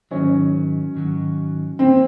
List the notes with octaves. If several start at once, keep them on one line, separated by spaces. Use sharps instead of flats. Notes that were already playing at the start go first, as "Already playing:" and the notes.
G#2 D#3 F#3 C#4
G#2 D#3 F#3
A#2 F3 C4